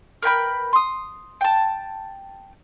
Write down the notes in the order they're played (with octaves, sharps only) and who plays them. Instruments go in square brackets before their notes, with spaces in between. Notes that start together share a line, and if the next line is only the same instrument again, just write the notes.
[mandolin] A#4 B4 G5 B5
C6 D#6
G5 A5